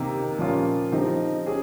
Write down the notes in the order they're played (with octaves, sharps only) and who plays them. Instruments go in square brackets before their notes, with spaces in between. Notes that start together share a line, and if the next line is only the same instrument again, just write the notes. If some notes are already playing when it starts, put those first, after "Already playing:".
Already playing: [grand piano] C3 D#3 A#3 [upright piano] G4
[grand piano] A#2 F3 A#3 C#4 F4
[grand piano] F3 C4 G4 [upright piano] D#4
[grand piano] C#4 G4 [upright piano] G#4